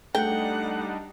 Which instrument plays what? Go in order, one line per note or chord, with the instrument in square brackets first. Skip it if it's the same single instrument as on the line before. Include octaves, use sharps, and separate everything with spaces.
[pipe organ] G3 D4 D#4 [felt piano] A3 [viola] F#5 [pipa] G5